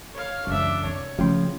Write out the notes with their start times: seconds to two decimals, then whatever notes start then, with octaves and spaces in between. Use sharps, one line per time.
0.14 C#5 F5
0.47 C#2 F#2 C#3 E3 D4 E5
0.84 C2 C#5
1.19 C#3 F3 A3 C#4 G5 C6